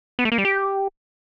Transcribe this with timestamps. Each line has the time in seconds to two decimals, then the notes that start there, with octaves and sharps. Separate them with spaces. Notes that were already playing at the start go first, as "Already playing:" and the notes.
0.19 B3
0.25 A3
0.32 A#3
0.38 G3
0.45 G4